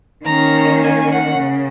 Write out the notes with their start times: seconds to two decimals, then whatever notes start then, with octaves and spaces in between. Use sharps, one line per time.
0.24 D#3 A#3 C#4 A#5
0.82 G#5
1.12 F#5
1.39 C#3